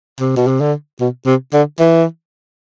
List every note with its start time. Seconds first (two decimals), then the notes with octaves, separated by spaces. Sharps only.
0.20 C3
0.37 B2
0.48 C3
0.61 D3
1.00 B2
1.26 C3
1.54 D3
1.80 E3